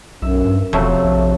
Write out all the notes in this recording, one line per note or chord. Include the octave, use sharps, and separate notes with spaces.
B1 F#2 E5
G2
E1 F2 C3 F#3 A3
A#1